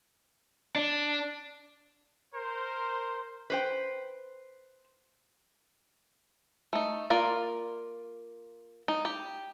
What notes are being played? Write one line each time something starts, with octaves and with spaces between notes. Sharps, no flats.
D4
A#4 C5
B4 C5 G5
A3 D#4
A#3 F4 A#4 D5
D#4
G4